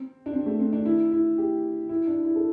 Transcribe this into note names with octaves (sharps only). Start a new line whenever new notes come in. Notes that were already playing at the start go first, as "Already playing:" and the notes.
Already playing: C4
D4
C4
A3
C4
D4
E4
E4
G4
E4
D4
E4
A4